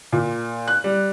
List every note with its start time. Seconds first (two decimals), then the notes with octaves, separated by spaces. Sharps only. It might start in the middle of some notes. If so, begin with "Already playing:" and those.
0.12 A#2
0.68 F#6
0.84 G3